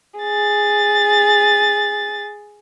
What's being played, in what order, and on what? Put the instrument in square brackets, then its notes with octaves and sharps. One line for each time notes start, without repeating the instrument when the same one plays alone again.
[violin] G#4 A6